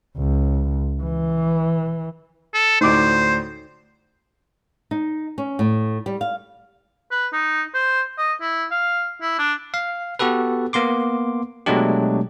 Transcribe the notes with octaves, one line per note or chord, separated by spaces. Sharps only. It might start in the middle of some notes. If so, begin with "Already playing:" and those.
C#2
E3
A4
D2 A2 D#4 C5 D6
D#4
C#4
A2
G3
F5
B4
D#4
C5
D#5
E4
F5
E4
D4
F5
B3 F#4 G4 A4 B4
A#3 B3 C6 D6
B2 F#3 G#3 A3 D4 G4